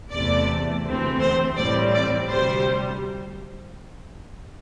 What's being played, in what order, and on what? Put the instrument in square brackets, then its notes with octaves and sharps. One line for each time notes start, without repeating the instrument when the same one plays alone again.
[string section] E2 C3 A3 D5
D2 C3 E3 A3 C4
C5
A2 E3 G3 C4 D5
D5
D2 C3 G3 C5